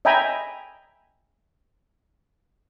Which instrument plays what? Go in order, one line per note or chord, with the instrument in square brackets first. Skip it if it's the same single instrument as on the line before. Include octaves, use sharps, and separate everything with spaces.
[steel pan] D#5 E5 G5 G#5 A#5 B5